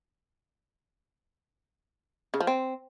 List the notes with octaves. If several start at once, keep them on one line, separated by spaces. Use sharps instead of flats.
C#3
F3
C4